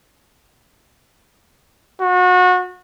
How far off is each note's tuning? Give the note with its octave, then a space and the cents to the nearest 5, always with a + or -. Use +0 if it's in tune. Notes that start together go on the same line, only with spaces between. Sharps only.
F#4 -30